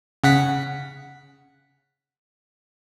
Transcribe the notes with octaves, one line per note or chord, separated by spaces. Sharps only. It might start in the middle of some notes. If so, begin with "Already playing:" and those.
C#3 F#5 B6